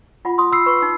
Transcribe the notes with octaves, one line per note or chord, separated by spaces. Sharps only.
F4 F#5 B5
C6 D#6
B5 E6 C7
B4 C#6
D#4